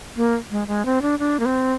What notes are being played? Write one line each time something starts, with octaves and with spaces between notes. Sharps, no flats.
A#3
G#3
G#3
C4
D4
D4
A#3
C4